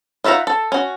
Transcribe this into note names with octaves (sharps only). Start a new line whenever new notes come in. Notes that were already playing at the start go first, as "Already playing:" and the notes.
D#4 F4 E5 F#5 A#5
A4
C#4 F#4